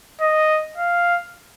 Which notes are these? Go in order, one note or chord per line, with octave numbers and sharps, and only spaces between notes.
D#5
F5